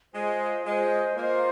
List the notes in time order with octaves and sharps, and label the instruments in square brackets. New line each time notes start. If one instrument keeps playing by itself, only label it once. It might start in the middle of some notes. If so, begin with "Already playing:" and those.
[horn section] G#3 [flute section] F4 C5 D#5
[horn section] G#3 [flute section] F4 C5 D#5
[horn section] A#3 [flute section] F4 C5 D#5